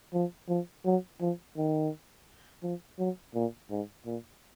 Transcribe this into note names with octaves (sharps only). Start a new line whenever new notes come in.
F3
F3
F#3
F3
D#3
F3
F#3
A#2
G#2
A#2